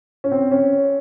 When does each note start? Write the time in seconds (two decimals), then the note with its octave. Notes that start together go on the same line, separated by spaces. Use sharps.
0.24 C#4
0.32 C4
0.51 C#4